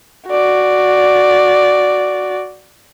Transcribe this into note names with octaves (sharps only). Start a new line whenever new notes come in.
F#4 D5